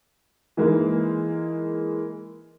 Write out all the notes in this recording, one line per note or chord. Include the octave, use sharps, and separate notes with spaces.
E3 G#3 A#3 D#4